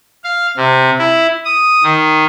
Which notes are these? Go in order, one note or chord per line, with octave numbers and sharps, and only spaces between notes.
F5
C3
E4
D#6
D#3